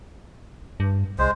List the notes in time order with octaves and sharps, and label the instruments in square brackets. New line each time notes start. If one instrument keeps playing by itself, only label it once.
[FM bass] G2
[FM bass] C2 [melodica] G#3 C5